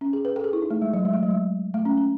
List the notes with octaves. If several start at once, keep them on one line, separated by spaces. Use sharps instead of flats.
C#4
G#4
B4
A4
G#4
E4
D#4
A3
G#3
F#3
G#3
A3
F#3
G#3
A3
C#4
C#4